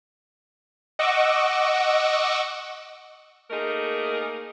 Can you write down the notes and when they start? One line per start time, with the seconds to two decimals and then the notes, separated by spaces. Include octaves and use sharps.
0.99 D#5 F#5 C#6 D6 E6
3.51 A3 A#3 D#4 G#4 A#4